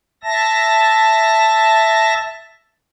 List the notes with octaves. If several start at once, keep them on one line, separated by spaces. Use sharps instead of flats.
E5 A5 A#6